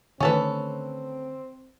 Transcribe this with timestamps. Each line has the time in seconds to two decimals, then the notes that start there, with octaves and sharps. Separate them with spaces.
0.20 D3 D#3 A3 C4 C#4 A4 B4